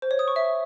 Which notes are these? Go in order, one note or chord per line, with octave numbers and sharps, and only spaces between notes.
C5
C#5
D#6
C#6
E5